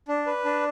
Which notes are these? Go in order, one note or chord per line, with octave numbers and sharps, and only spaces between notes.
D4
B4
D4